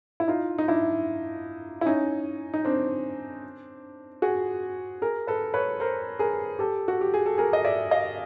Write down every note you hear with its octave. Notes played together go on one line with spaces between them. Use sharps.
E4
D#4 F4
D#4
D4 E4
E4
C#4 D#4
D#4
C4 D4
F#4 G#4
G#4 A#4
A4 B4
B4 C#5
A#4 C5
G#4 A#4
G4 A4
F#4
G4
G#4
A4
G#4 A#4
D#5
D5 E5
D#5 F5